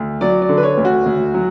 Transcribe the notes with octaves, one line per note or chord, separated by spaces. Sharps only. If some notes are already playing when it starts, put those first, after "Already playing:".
Already playing: D2
F#3 D5
D5
D3
B4
C#5
D2
F#4
D2
F#3